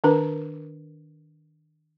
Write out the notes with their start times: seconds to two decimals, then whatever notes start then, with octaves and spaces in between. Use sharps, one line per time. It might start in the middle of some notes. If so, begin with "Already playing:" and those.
0.04 D#3 D4 A#4 B4